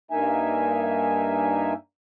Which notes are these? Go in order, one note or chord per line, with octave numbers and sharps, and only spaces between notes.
G2 A#3 D#4 E5 G#5